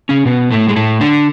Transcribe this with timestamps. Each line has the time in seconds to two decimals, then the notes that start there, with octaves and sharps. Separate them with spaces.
0.09 C#3 C#4
0.26 B2 B3
0.51 A2 A3
0.68 G#3
0.76 A2 A3
1.01 D3 D4